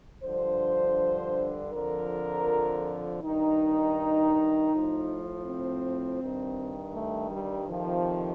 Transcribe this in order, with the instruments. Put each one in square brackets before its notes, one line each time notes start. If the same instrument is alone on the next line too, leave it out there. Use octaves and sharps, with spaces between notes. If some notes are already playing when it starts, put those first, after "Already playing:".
[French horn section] G2 D3 F3 C5
F2 D3 F3 A#4
G2 D#3 D#4
A2 F3
C4
G2 D#3
A3
G3
F2 C3 D#3 F3